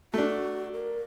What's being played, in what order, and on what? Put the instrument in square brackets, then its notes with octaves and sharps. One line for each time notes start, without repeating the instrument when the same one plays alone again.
[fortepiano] A3 D4 [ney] F#4
[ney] A#4